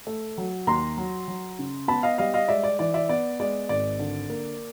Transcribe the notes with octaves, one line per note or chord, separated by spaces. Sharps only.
A3
F#3
D#2 A#5 C6
F#3
F#3
C#3
B3 A5 B5
D#5 F5
G3 D#5 F5
D#5 F5
G#3 D5 E5
D5
E3 D5
D5 E5
B3 D5
G#3 D5
G#1 D5
D3
A#3